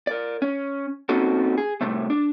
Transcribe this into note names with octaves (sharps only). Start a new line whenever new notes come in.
A#4 D5
C#4
A#3 C4 C#4 D#4 F#4 A4
G#4
A2 C3 G3 A3
D4